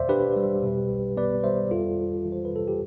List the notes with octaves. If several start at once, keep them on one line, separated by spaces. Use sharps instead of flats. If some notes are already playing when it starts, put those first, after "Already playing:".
Already playing: E2 B2 C5 D5 E5 F5
D4 G4 B4
G3
B2
B1
B3 B4 D5
G3 C5 E5
F2 F4 A4
G1
E3
C5
B4
C3 A4
G4